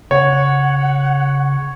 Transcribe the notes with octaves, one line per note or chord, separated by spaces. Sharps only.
C#3 C#5 F#5